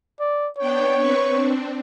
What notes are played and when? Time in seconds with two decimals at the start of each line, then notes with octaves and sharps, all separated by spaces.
0.20 D5
0.58 B3 D4 C#5 G5
0.98 C4 B4 C#6
1.31 C4 D4